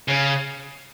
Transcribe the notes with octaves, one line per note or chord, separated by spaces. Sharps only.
C#3